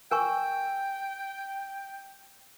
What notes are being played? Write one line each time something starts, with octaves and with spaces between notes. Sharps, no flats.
A#4 G5 G#5 C#6